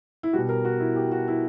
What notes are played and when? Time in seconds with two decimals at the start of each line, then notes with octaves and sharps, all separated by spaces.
0.23 E4
0.33 B2 G3 F#4
0.49 A#4
0.65 F#4
0.80 E4
0.96 G4
1.12 F#4
1.28 E4